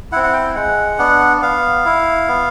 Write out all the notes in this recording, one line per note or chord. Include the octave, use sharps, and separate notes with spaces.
C4 E4 F#5
F#5
G5
G#3 F#5
B3 D4
B3 F5
E4
B3